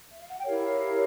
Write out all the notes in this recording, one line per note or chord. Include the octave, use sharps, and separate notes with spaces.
E5
F5
F#5
G5
E4 G4 A#4 C#5 F5